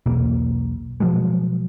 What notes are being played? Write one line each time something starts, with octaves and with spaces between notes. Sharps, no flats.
B1 E2 B2 A#3
B2 F3 F#3 G#3